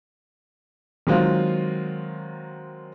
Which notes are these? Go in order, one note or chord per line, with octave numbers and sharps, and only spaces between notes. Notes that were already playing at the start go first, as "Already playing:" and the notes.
D#3 F#3 G#3 C4 F4